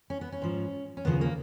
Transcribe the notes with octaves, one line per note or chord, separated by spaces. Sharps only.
C#4
B3
C#4
G#2 F3
C#4
D#2 C#3 F3 B3
A#3